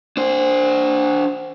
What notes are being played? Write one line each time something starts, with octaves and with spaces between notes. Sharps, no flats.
D4 C5